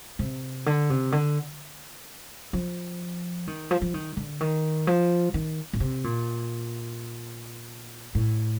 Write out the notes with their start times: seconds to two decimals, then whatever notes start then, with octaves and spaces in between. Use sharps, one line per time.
0.19 C3
0.66 D3
0.90 C3
1.12 D3
2.53 F3
3.47 D#3
3.71 F3
3.81 F3
3.94 D#3
4.17 D3
4.41 D#3
4.87 F3
5.34 D#3
5.73 A#2
5.80 C3
6.04 A#2
8.15 A2